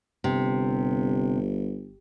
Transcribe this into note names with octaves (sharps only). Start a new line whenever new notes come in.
G1 C3